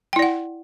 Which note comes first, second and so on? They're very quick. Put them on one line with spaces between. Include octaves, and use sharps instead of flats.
G5 E4 D5 F#5